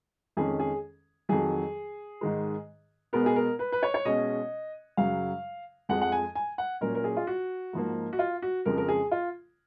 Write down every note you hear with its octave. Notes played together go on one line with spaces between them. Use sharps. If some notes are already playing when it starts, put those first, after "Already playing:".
F2 D#3 G#3 C#4 G#4
G#4
F2 D#3 F#3 G#4
G#2 D#3 G#3
B2 G#3 B3 A#4
G#4
A#4
B4
B4
C#5
C#5
B2 G#3 C#4 D#5
F#2 C#3 F#3 F5
F2 F3 G#3 F#5
F#5
G#5
G#5
F#5
A#2 F#3 C#4 A#4
A#4
G#4
F4
F#4
G#2 F3 A#3
F#4
F4
F#4
F2 C#3 F3 G#3 A#4
A#4
G#4
F4